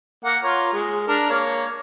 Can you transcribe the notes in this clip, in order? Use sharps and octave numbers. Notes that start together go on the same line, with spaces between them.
A#3 F#5
F4 C#5 A#5
G#3
D4 A#4
A#3 C#5